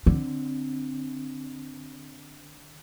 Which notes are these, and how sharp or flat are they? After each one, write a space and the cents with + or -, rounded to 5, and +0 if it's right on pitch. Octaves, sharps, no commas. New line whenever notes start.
D3 +0 C4 +0